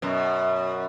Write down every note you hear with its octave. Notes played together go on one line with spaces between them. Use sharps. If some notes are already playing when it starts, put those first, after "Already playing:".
F#2 B2